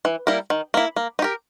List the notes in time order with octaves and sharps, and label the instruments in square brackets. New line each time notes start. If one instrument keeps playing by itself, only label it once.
[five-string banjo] E3
G3 A#3 E4 A#4
D#3
A#3 E4
A#3
D#4
G4 A#4